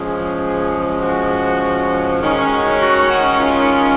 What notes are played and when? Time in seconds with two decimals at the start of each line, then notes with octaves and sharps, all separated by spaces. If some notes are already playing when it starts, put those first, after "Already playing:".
Already playing: F3 G#3 C#4 G#4
1.03 F#4
2.21 D#3 G#3 C#4
2.50 F#4
2.80 F#4
3.10 F#4
3.39 F4